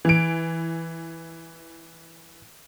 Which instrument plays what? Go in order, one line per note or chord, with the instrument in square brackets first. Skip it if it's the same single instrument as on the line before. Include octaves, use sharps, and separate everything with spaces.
[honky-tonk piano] E3 D7